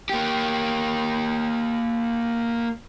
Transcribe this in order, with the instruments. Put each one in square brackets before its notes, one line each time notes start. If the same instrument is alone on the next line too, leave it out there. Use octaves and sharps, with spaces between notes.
[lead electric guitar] A#3 G4